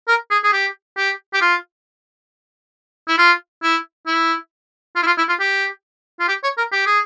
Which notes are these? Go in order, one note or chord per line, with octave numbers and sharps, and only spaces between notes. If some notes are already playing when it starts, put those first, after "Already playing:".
A#4
G#4
G#4
G4
G4
G4
F4
E4
F4
E4
E4
F4
E4
F4
E4
F4
G4
F4
G4
C#5
A#4
G4
G#4